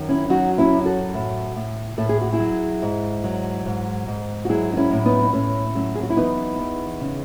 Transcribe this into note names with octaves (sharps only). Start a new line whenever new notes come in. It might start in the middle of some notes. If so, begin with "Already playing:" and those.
Already playing: F#2 D#3
C#4 E4
F#3 D#4 F#4
C#4 E4
F#2
F#4 A4
A2
A2
A2 A4
G#4
F#4
E4 G#4
F#3
G#2
F#3
G#2
G#2
F#4
F#3 E4 G#4
D#4
C#4 E4
A2
B3 D#4
D#4
A2 A3 C#4
F#3 A3 C#4
G#4
F#4
E4
E3 B3 D#4
E2
C#3